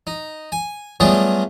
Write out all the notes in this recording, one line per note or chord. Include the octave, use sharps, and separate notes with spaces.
D#4
G#5
F#3 G3 A3 B3 F4 G#4